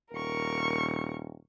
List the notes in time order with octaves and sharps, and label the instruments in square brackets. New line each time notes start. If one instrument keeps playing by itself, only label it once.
[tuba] D#1 [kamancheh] A#4 C#6